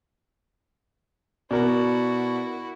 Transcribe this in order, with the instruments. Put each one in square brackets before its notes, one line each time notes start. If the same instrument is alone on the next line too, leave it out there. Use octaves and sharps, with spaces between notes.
[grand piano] B2 [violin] E4 F#4 [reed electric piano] A#4 D5